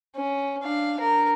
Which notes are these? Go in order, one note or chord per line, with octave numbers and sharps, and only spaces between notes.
C#4
D4 F5
A#4